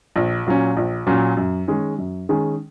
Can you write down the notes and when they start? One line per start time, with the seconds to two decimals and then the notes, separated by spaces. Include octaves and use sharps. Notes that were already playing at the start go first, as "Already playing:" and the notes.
0.16 A#1
0.47 A#2 F#3 C#4
0.77 A#1
1.07 A#2 F#3 C#4
1.37 F#2
1.68 D#3 G#3 C#4 G#4
1.98 F#2
2.29 D#3 G#3 C#4 G#4